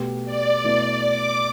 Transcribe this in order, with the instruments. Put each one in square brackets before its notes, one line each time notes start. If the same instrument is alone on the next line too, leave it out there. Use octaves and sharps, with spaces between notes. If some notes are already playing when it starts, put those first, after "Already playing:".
Already playing: [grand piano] B2 A3 G4
[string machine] D5
[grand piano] B2 A3 E4
[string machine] D6